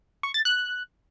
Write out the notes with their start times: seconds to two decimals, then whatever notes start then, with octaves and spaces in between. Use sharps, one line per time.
0.23 C#6
0.34 A6
0.45 F#6